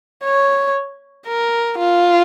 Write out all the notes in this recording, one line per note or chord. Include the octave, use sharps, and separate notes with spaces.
C#5
A#4
F4